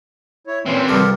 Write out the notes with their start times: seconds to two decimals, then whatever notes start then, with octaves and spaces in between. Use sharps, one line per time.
0.47 E4 C#5
0.66 A#2 E3 C4 C#4
0.89 C2 G2 F3 G4 A4 A#4